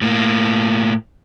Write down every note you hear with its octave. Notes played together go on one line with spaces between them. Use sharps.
A2 A#3